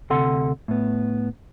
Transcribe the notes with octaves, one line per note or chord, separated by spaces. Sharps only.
D2 C3 A4 F#5 C6
A2 B3